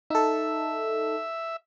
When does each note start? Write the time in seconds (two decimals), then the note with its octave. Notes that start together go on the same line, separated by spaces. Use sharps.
0.10 D#4 A4 E5